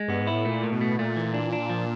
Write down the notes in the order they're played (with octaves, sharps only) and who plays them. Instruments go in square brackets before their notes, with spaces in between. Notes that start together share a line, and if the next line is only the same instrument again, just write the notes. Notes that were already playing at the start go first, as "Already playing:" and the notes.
Already playing: [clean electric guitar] G#3
[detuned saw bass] G2 [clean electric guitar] B3
[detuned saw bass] G#2
[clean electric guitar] E4
[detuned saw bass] A2
[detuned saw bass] A#2 [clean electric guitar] A3
[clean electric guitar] A2
[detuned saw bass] B2
[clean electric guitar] A3
[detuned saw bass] A#2 [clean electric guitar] A3
[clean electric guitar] E3
D4
D4
F3